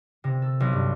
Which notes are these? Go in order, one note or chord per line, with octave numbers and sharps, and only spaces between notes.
C3
A4
B1
G2